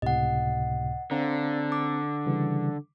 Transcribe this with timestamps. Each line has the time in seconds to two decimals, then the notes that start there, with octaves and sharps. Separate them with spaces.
0.02 C#2 A2 C3 D#5 F#5
1.11 D3 C4 D5 F5 A#5
1.72 D6
2.26 C#3 E3 G3